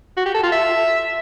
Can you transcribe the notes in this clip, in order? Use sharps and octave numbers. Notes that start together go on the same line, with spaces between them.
F#4
G4
A4
F4
E5